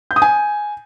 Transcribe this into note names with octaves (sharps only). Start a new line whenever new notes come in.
G6
D#6
G#5